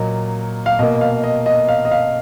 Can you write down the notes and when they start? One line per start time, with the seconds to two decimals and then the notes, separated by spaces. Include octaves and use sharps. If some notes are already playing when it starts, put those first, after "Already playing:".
Already playing: A#2 F#3 A#3 D#5
0.66 F5
0.79 B2 A#3 D#5
1.01 F5
1.24 D#5
1.46 D#5
1.68 F5
1.85 D#5
1.91 F5